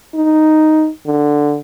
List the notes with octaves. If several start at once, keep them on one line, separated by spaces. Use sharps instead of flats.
D#4
D3